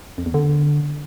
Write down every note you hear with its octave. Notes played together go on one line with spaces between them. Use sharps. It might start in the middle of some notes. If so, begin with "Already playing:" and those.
F2
E2
D3